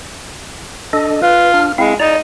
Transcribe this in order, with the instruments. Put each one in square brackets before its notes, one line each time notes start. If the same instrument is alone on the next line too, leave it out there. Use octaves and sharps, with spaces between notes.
[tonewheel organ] D4 A4 D#5
[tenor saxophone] F4 [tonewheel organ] B4
[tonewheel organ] D4 F6
[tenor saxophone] G#3 [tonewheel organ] C4 E4 F5
[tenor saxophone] D#4 [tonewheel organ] D5 A#5